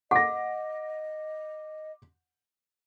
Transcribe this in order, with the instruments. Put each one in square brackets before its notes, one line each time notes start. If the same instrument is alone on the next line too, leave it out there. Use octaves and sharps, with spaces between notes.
[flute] D#5 [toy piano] F#5 [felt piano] D6 A#6